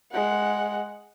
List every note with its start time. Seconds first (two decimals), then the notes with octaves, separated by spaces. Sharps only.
0.12 G#3 F#5